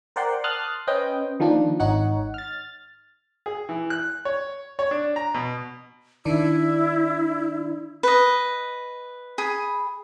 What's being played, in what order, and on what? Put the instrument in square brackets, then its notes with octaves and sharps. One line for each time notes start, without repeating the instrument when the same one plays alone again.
[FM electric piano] A#4 C5 D5 F#5 G5 C6
A5 C6 D#6 F6 F#6 A6
C#4 B4 C5 D#5 G5
D#3 F3 A#3 D4
G#1 D#4 C#5 F#5
F6 A6
[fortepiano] G#4
E3
F#6
C#5
C#5
D4
A#5
B2
[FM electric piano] D#3 D4 D5 [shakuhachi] E4
[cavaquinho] B4 D#5
G#4 B5